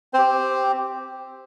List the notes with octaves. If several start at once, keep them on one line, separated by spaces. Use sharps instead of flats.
C4 G4 C5